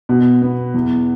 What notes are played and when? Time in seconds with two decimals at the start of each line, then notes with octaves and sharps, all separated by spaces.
0.09 B2
0.42 B3
0.74 E2